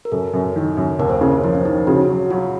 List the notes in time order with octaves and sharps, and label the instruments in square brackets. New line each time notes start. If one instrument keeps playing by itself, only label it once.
[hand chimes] A#4
[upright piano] F#2 [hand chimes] A4
[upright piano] F#2
D#3
F#2
[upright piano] D#2 [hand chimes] A#4
[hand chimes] C5
[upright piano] C#3 [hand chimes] C5
[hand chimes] C#5
[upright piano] F3 [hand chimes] A#4
[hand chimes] C#4
[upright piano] F3 [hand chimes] D#4
[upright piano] C#3 [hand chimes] F#4
[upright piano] F#3
[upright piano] F#3 [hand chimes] F4